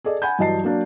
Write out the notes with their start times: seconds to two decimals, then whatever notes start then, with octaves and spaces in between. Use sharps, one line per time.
0.04 G#4 A4 D5 D#5
0.22 F#5 G#5 B5 G6
0.39 G2 E3 F#3 D#5 A5 C7
0.64 F#3 A#3 D4